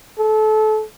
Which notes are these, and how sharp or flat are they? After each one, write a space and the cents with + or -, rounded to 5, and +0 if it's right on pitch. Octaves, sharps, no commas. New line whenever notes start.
A4 -25